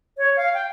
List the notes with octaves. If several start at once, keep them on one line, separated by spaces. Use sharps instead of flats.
C#5
F5
G5